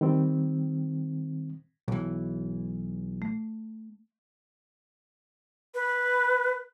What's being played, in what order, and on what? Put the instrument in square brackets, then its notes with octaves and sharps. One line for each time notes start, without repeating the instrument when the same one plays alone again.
[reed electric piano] D#3 G3 C4
[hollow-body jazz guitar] B1 E3
[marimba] A3
[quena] B4